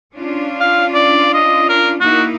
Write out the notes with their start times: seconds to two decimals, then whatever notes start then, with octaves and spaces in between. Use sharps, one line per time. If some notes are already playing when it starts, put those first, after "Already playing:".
0.13 C#4 D4 F4
0.60 F5
0.94 D5
1.34 D#5
1.69 A#4
2.01 A#3 D#4 E4 F#4